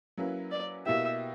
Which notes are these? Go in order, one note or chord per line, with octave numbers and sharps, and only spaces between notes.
F#3 A#3 C#4 E4 B4
D5
B2 A#3 E4 G4 E5